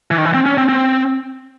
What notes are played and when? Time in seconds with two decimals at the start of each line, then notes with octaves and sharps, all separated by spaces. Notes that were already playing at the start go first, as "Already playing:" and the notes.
0.11 E3
0.18 D#3
0.25 E3
0.34 C4
0.46 C#4
0.58 C4
0.69 C4